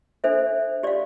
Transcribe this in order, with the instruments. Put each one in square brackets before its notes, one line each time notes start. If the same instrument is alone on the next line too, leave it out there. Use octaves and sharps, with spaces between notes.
[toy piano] D4 A4 C5 E5
G4 D5 F5